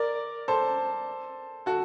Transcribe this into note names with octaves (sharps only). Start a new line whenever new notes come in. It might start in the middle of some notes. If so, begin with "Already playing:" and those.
Already playing: A#4 D5
A4 C5
F#4 A4